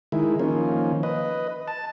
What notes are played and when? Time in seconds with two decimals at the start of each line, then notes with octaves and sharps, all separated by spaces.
0.12 D#3 G#3 E4
0.40 D#3 F3 A#3 C#4
1.03 B4 D#5
1.68 A5